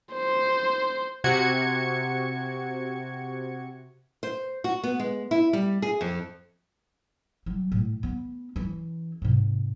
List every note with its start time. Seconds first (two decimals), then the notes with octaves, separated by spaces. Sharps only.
0.13 C5
1.24 C3 F#4 G#6 C#7
4.23 C5
4.64 F#4
4.84 B3
4.99 G#3
5.31 E4
5.53 G3
5.82 G#4
6.01 F2
7.46 F#3 G3
7.72 A2
8.03 B3 C#4
8.56 E3 C#4
9.22 G#2 C3